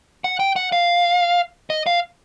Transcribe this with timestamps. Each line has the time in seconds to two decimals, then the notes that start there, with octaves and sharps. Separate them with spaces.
0.24 F#5
0.40 G5
0.56 F#5
0.72 F5
1.70 D#5
1.86 F5